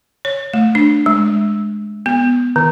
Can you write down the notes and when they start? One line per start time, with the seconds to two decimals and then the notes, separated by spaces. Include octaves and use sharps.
0.25 C#5
0.54 A3
0.75 D4
1.06 G#3
2.06 B3
2.56 D#3